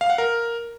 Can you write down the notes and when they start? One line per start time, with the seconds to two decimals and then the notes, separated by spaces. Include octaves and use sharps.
0.01 F5
0.10 F#5
0.18 A#4